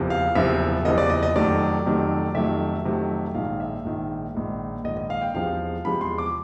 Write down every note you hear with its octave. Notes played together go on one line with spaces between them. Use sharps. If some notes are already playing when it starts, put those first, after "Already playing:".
Already playing: F#1 E2 C3 F3
F5
F#1 E2 C3 F3 E5
F#1 E2 C3 F3 D#5
D5
D#5
D#5
F2 C3 D#3 F#3 A3 D5
F2 C3 D#3 F#3 A3
F2 C3 D#3 F#3 A3 E5
F2 C3 D#3 F#3 A3
A#1 G#2 D#3 F5
E5
A#1 G#2 D#3
A#1 G#2 D#3
A#1 G#2 D#3 D#5
D#5
F5
G5
E2 C3 F3 G#3 F5
E2 C3 F3 G#3 B5
C6
D6